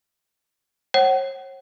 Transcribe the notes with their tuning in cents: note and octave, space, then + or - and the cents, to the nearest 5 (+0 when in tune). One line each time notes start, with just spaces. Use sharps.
C#5 -45 F#5 +35